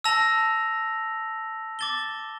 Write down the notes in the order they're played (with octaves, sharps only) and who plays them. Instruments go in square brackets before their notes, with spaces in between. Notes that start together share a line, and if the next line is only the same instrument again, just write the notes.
[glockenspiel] A5 E6 A#6 F7
D6 A6 E7 G7